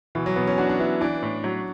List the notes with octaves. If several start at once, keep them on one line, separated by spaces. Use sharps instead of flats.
B2 E3
F#3
B2 B3
C#4
D4 F#4
D4
B3 E4
E3 D4
A2
F#3